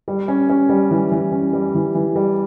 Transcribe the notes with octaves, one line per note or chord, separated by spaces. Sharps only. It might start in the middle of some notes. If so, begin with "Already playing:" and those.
G3
C#4
C#4
G3
E3
E3
C#4
G3
E3
E3
G3